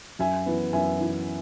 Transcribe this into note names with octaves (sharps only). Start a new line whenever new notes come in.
F#2 E5 G#5
E3 B3
F#2 E5 G#5
E3 B3